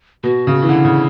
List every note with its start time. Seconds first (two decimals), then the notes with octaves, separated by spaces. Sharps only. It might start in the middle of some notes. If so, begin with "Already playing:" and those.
0.24 B2 F#4
0.47 C#3
0.62 E3
0.69 D3 E4
0.85 C#3